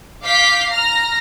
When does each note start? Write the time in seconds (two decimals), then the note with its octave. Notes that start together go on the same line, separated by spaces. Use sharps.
0.23 F5 D6 G6 B6 C7
0.70 A#5 F6 A#6